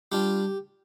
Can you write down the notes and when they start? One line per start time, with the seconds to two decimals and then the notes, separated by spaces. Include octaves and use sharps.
0.12 G3 D4 F4 G4